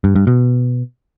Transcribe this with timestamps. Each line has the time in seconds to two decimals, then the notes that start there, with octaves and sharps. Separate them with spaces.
0.04 G2
0.15 G2
0.27 B2